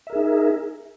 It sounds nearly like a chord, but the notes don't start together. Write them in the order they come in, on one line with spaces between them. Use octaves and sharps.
E5 A#4 G#4 D#4